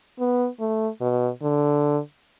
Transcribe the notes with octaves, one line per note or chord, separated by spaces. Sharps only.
B3
A3
B2
D3